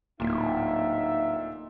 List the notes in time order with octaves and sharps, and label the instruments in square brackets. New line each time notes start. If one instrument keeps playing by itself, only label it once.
[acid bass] D1 [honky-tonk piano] A#2 [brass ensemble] D#4 E5